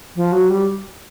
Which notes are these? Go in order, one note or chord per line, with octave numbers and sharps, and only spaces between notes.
F3
F#3
G3